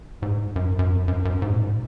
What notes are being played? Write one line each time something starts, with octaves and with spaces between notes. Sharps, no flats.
G#2
F#2
F#2
F2
F#2
F#2
G#2
A#2
G#2
A#2